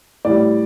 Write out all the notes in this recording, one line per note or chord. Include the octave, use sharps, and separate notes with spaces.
A2 G3 D5